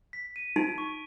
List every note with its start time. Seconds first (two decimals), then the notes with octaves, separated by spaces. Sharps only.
0.13 B6
0.36 D#7
0.56 D#4 D7
0.78 C#6